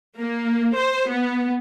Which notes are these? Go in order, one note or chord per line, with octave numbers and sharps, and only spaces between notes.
A#3
C5
B3